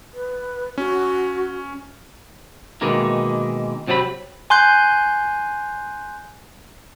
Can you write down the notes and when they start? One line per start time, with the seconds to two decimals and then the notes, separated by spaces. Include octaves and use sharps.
0.14 B4
0.78 C#4 F#4
2.81 B2 D#3 E3 G#3 A#3
3.88 C3 F#3 C4 D5 B5
4.50 G#5 C6 F#6 G6